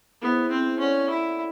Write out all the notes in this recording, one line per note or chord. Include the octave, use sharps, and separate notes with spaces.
B3 E4 G#4 C5 E5
C4
C#4 E4 A4 D5 F#5
E4